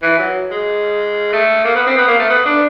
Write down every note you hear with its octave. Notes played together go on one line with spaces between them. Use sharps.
E3
F#3
G#3
A3
A#3
B3
C4
B3
A#3
A3
B3
D4